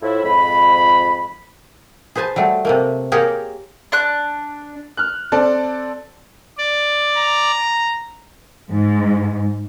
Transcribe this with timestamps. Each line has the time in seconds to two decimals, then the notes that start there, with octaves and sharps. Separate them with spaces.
0.02 A2 F3 E4
0.24 F2 G#2 B5
2.15 G#4 B4 C5 G#5 A5
2.36 F#3 G3 A3
2.65 C3 A3 A#3
3.12 A#3 G4 G#4 A#4 C#5
3.92 D4 F#6
4.97 F6 F#6
5.32 C4 A4 D5 A5
6.58 D5
7.17 A#5
8.71 G#2